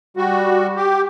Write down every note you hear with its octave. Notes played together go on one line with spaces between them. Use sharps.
G3 F#4
G4